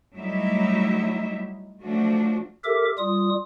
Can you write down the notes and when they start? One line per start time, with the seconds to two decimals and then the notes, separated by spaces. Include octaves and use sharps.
0.16 F#3 G3 A3 D#4 E4 E5
1.82 F3 F#3 A3 D4 F#4
2.64 G4 A4 A#4 E5 D6
2.98 G3 F4 D#6